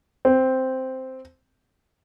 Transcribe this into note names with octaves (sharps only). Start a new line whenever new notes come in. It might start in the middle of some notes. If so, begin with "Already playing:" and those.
C4